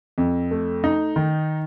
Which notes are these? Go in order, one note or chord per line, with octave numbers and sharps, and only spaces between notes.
F2
A3
D#4
D#3